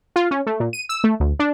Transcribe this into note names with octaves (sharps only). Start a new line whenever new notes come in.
F4
C#4
A3
A#2
D#7
E6
A3
D2
D4